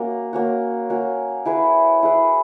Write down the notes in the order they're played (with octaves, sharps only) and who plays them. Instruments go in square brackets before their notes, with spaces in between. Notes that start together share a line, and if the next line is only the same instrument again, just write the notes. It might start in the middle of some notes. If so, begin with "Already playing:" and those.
Already playing: [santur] A#3 C#4 F#4
A#3 C#4 F#4
A#3 C#4 F#4
E4 G#4 B4
E4 G#4 B4